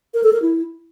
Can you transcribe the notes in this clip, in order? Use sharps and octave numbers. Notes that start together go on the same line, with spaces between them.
A#4
A4
A#4
E4